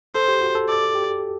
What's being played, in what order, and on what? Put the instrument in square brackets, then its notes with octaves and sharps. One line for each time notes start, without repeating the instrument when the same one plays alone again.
[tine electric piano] A4 [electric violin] C5
[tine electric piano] G4
F#4
A4
[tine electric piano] A4 [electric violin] D5
[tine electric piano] G4